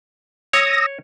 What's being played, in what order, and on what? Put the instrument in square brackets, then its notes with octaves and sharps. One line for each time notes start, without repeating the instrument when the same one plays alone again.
[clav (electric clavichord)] C#5 [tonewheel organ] D#6 E6 A#6